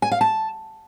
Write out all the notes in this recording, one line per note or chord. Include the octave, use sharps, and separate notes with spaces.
G#5
F5
A5